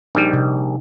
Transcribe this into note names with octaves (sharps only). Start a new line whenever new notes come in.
A#1 G3 D4 D#4
C3